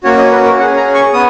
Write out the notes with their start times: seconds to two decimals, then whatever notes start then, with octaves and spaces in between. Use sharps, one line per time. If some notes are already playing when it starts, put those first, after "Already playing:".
0.04 A#3 C#4 F#4 C#5
0.18 D#5
0.32 B4
0.45 A#4
0.59 C#4 F#5
0.61 G#4
0.76 A#5
0.94 C#6
1.13 B3 D#6